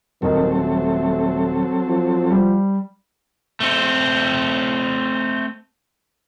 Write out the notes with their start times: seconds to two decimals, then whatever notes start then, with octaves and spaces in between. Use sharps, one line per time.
0.22 D#1 D#3 F#3 C4 A4
0.55 A3
1.88 F3
2.31 G3
3.60 A3 C4